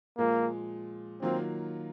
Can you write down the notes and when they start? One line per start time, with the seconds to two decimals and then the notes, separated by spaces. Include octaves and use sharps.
0.18 A#2 F3 G#3 A#3
1.21 D#3 F#3 A#3 C4 F4